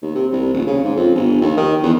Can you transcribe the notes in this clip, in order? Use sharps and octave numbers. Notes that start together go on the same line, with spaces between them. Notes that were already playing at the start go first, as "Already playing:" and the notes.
D#2
C3
C2
D#1
C#3
G#2
F2
G1
D#2
D#3
E2